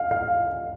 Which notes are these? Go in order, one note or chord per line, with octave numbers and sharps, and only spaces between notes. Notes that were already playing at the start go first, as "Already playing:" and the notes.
Already playing: F5
F5